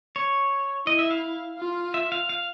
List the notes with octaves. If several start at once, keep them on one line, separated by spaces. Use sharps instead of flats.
C#5
E4 D#5
E5
F5
F4
E5
F5
F5